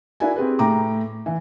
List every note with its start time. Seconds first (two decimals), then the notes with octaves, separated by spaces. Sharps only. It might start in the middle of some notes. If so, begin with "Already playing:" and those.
0.20 D4 E4 F#4 A#4 G#5
0.36 C4 G4 G#4 B4
0.59 A2 G5 A#5 D6
1.26 E3